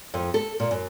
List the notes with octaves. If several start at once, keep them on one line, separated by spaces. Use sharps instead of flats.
F2
A4
A#2
F#2